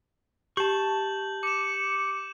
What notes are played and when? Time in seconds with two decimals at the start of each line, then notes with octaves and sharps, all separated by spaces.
0.57 G4 A5 C#6 G6 F#7
1.43 D6 C#7 E7